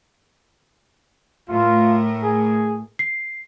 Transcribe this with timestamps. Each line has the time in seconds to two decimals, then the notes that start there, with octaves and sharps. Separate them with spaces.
1.49 A2 A3 F4 A#4
2.22 G#4
2.99 C7